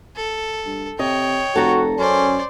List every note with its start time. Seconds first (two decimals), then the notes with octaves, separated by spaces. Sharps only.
0.16 A4
0.65 G2
0.99 C3 C#5 D#5 G5
1.56 F1 F#4 A4 A#5
1.98 F#2 C#4 C5 D5